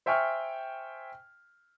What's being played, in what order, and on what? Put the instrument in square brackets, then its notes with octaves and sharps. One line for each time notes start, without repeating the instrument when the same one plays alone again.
[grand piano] C5 E5 G5 G#5 C#6 F6